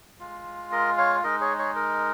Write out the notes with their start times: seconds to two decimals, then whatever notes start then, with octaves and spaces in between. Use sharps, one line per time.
0.20 G#3 F4
0.72 A#4 D#5
0.97 C#5 F5
1.24 G#3 D#4 A#4 D#5
1.41 G#4 C#5
1.58 G#4 C#5
1.76 A#4